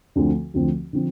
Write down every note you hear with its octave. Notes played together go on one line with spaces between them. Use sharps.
D2 D3 F3 C4
D2 D3 F3 C4
D3 F3 C4